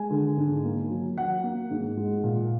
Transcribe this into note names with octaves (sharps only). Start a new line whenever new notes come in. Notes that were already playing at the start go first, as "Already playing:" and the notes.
Already playing: G#3 G#5
D3
G#2
A#3
F#3
F#3 F#5
A#3
G#2
G#3
A#2